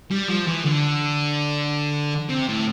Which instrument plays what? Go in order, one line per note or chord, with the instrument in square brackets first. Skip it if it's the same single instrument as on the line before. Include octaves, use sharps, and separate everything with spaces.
[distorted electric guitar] G3
F3
E3
D3
C3
A2